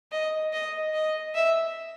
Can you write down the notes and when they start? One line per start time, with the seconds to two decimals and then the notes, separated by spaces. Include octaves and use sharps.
0.12 D#5
0.53 D#5
0.94 D#5
1.35 E5